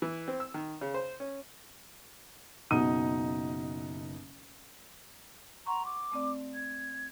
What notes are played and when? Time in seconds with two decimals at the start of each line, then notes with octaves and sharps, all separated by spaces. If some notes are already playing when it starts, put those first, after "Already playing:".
0.02 E3
0.28 C4
0.40 E6
0.54 D#3
0.81 C#3
0.94 C5
1.20 C#4
2.71 F#1 B2 D#4 F#5 D#6 D#7
5.66 F#5 A#5 C6 C#6
5.85 D6
6.12 A3 C4 D5
6.54 G#6